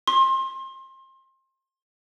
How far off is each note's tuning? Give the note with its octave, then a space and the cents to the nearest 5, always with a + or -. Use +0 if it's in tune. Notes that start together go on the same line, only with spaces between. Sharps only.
C6 +30